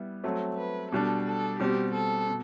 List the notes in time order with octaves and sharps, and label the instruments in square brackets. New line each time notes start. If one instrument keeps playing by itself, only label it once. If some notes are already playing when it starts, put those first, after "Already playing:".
Already playing: [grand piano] G3 B3 E4
F#3 A3 C4
[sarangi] B4
[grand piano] B2 G3 D4 [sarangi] A4
[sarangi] A4
[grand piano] B2 G3 C4 [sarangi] G4
[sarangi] A4
[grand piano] B2